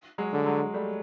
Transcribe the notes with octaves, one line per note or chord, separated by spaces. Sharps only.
F#3 G#3
D3
F#3 G#3
G3 A3